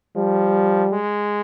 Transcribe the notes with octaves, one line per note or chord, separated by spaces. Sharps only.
F3 G3
G#3